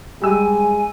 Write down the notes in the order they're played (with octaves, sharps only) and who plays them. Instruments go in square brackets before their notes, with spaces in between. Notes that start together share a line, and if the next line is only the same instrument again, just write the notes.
[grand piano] G3 E6 [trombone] G#3 [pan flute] G#5